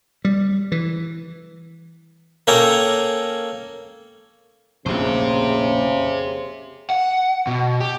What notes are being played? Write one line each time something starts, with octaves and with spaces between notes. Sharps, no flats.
G3
E3
A#3 C#4 A4 G5 G#5 A#5
F1 A#1 C#3 G4 C5
F#5
B2
G4